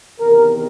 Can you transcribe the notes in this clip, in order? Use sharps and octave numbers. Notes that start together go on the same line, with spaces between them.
E2 C3 D#3 A#4